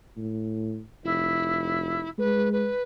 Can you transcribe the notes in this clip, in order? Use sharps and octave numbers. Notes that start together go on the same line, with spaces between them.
A2
F1 E4
G#3 B4
B4